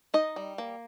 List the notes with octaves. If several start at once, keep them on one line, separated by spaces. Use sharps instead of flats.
D#4 D#5
G3
A#3